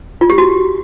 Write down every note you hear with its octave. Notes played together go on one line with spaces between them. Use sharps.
F4
G4
F#4